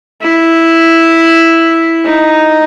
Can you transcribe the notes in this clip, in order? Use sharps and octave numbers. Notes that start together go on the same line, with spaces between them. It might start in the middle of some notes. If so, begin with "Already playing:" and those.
E4
D#4